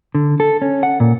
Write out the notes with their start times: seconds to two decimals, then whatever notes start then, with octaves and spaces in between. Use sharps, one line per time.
0.15 D3
0.40 A4
0.62 C#4
0.83 F#5
1.00 A#2